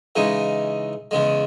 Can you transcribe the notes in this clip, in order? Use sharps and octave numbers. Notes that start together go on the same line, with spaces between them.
C#3 E3 G#3 D#4
E2 C#3 G#3